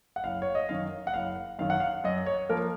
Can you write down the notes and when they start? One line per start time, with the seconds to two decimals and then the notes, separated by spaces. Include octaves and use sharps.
0.16 F#5
0.24 F#1 F5
0.42 C#5
0.55 D#5
0.69 F#2 D#3 F5
1.07 F#5
1.14 F#1 F5
1.59 F#2 D#3 F5
1.70 F#5
1.80 F5
2.04 F#2 D#5
2.26 C#5
2.49 F3 A#3 A#4